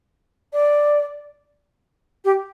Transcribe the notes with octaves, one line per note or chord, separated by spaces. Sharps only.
D5
G4